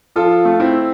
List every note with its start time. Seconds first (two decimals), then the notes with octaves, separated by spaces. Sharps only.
0.16 F3 F4 A4
0.45 A3
0.60 C4 E4